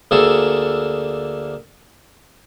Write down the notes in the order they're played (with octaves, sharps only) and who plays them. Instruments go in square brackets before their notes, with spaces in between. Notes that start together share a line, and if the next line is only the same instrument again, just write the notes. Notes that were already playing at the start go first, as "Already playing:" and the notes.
[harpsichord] D2 D3 A#3 G#4 A4